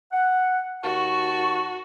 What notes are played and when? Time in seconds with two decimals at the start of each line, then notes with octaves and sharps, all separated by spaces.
0.12 F#5
0.83 D#2 F#4 A5 C#6